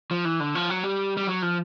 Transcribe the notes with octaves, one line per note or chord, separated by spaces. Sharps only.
F3
E3
D3
F3
F#3
G3
G3
F#3
F3